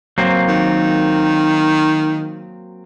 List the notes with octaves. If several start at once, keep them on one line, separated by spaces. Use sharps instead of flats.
F#3 A#3 C4
D#3